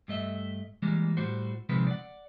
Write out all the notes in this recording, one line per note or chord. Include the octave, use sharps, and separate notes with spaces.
G2 A3 D#5 E5
E3 G3 G#3 A#3
A2 G3 F#4 C5
C3 D#3 F3 G#3 C4 B4
D5 F#5